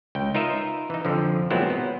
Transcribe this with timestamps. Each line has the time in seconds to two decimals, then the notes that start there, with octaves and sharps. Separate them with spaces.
0.15 C#2 G5
0.35 D#4 F4 A#4 B4 D#5 E5
0.90 E3 D#4
1.05 F2 D3 F3
1.50 A#2 F#3 G#3 B3 C4 E4
1.70 B3